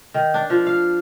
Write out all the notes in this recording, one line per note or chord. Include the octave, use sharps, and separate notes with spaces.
D#3
D4
F3
F5